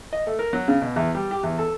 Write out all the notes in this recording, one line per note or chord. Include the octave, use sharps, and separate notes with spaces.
D#5
A3
A#4
F#3
C#3
B2
E2
G3
G4
E2
A4